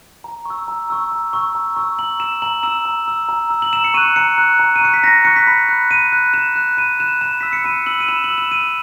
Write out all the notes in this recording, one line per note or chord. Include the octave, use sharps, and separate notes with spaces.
A#5
C#6 E6
A#5
C#6 E6
A#5
C#6 E6
A#5
C#6 E6
A#5 F#7
E6 E7
A#5 F#7
E6 E7
A#5
E6
A#5
E6
F#7
A#5 E7
C#7
C#6 F#6 D#7
A#5 C#7
C#6 F#6
A#5
D#7
C#6 F#6 C#7
B6
A#5 A#6
C#6 F#6 C#7
B6
B5
F#6
B5 D#7
F#6
B5 E7
F#6
B5 D#7
F#6 E7
B5 E7
E6 B6
C#7
B5 D#7
E6 F#7
D#7
B5 E7
F#7
E6
E7
B5 D#7